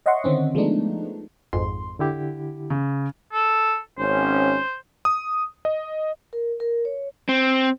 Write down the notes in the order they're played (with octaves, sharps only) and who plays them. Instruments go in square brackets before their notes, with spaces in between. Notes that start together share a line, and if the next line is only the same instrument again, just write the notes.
[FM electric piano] C#5 D#5 E5 F#5 C6 C#6
D3 D#3 C4 C#4
F3 G#3 A3 B3 D4 D#4
[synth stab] G#1 F2 G#2 [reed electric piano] C6
[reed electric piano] D3 E4 G4
[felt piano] C#3
[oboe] A4
[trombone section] G#1 C#4 [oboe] C5
[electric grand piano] D#6
D#5
[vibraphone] A#4
A#4
C#5
[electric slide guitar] C4